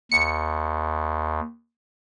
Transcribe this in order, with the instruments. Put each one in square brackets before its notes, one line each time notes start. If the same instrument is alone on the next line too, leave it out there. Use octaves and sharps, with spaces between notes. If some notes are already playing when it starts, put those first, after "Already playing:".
[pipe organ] D#2 [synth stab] C#7